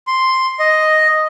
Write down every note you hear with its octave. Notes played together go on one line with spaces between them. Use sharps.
C6
D#5